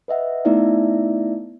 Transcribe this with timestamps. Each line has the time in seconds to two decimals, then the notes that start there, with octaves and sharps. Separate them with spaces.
0.08 B4 D#5 E5 F#5
0.45 A3 B3 D#4 E4 D5 E5